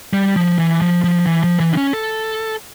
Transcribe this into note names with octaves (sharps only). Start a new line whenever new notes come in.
G3
F3
E3
F3
F3
E3
F3
E3
D4
C#4
A4